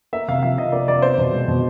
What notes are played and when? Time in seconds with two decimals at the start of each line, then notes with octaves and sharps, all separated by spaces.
0.13 A#3 E5
0.28 C3 F5
0.43 F3 F5
0.58 C3 D#5
0.72 A#3 D5
0.88 C3 D5
1.02 B3 C5
1.18 B2
1.33 G#3
1.48 B2